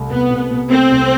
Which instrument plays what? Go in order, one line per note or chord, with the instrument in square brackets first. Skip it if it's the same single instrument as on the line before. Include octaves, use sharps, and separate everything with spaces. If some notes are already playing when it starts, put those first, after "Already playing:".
Already playing: [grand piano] C2 C3 A3
[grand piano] C2 [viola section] B3
[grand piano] C3
C3
[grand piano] A3 [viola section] C4
[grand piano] C2